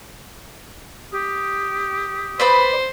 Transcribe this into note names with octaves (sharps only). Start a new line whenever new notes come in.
G4 D#6
B4 C5 D5 B5